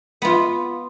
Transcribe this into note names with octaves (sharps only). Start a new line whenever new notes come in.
B3 F4